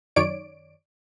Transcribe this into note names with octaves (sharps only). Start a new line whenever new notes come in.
F#2 D#3 C#5 D5 D7